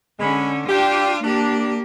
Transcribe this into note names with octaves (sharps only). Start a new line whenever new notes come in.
D3 G#3 C#4 B5
D4 F4 G4
A#3 D4 G4